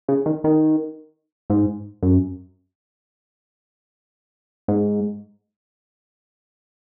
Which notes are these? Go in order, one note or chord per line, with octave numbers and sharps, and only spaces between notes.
C#3
D#3
D#3
G#2
F#2
G#2